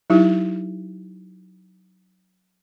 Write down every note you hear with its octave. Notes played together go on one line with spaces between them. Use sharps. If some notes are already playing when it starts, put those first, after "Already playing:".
F#3 D#4 E4 G4